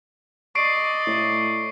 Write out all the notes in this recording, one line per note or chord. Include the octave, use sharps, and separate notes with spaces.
D5 D#5 C#6 C7 D7
A2